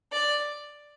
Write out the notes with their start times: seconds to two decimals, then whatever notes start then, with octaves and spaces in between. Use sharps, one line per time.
0.12 D5